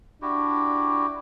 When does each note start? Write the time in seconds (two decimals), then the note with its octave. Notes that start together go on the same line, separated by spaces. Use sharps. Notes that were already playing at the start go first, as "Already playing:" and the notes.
0.22 D4 E4 F#4 G4